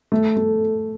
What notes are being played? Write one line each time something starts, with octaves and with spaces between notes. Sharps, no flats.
A3
A3